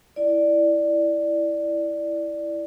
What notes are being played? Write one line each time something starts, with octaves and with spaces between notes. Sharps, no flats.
E4 D5